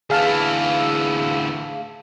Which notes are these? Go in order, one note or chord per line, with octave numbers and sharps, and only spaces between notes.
D2 E3 G#4 F5 A5